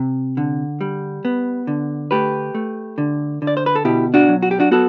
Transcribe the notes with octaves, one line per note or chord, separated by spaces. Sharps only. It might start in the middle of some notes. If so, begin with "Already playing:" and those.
Already playing: C3
D3
G3
B3
D3
A3 G4 B4
A3
D3
D3
D5
C5
B4
A4
B2 E4 G4
D4 F#4
F#3
F#4
G4
D4 F#4
B3 F#4 A4